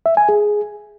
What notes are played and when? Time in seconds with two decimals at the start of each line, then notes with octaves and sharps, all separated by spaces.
0.06 E5
0.17 G#5
0.29 G#4